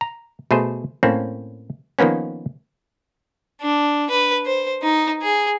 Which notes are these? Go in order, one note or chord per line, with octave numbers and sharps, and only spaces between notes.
A#5
B2 A3 G#4 C5
A2 A#3 C4 C#4
D#3 F3 A#3 B3 C#4
D4
B4
C5
D#4
G#4